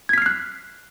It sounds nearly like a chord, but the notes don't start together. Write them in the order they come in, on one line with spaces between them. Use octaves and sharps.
G#6 B6 F6 C7 F#6